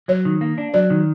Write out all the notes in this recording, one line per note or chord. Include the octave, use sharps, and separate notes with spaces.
F#3 C#5
D#3
A#3
D4
F#3 D5
D#3